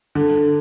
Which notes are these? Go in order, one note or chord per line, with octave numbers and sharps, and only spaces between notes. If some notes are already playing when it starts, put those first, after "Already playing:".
D3